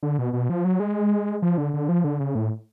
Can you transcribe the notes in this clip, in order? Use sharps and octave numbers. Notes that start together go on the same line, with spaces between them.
D3
B2
B2
F3
F#3
G#3
F3
D3
D3
F3
D3
C#3
A2